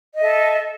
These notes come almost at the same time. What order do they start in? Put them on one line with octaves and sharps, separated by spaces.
D#5 E5 A4